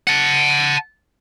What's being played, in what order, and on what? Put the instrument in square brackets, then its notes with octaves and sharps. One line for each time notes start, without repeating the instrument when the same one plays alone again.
[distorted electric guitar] F#5 A5